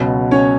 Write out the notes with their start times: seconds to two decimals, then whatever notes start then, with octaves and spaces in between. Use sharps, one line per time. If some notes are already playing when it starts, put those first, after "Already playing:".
Already playing: C#2 B2 F#3
0.31 C#4 C#5